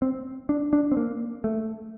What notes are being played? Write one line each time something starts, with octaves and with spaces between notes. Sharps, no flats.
C4
D4
D4
C4
A#3
A3